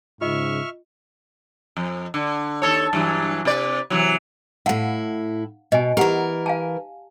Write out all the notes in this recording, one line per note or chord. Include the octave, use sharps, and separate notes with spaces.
G#2 C#3 F4 D#5 E5 C#6 F6
F2
D3
D#2 A4 C#5
G2 E3 F#3
C3 B4 D5
C3 E3 F#3
A2 E4 F5 F#5 A5
B2 D#5 G#5
E3 G4 A#4 F#5 A#5
F5 G#5 A5